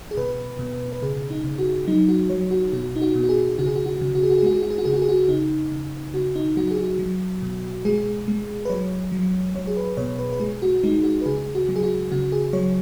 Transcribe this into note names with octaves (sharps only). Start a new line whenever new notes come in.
G#4
B2 B4
B2
B4
C#3 G#4
D#4
C#3
F#4
F#3 D#4
F#4
F#3 C#5
F#4
B2 F#4
D#4
F#4
B2
F#4
G#4
C#3 F#4
G#4
F#4
F#4
C#3
F#4
G#4
F#4
G#4
G#3 F#4
G#4
F#4
G#4
F#4
C#3 G#4
F#4
G#4
F#4
C#3 D#4
C#3
C#3 F#4
D#4
F#3 F#4
G#4
F#4
F#3
B2
G#3 G#4
G#3
B4
F#3 C#5
F#3
F#3 C#5
G#4
B4
B2 C#5
B4
B4
G#3 G#4
F#4
G#3 D#4
F#4
B4
C#3 G#4
F#4
F#3
G#4
F#4
C#3 F#4
G#4
F#3 C#5